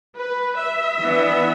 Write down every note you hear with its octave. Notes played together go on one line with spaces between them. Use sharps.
B4
E5
E3 B3 D4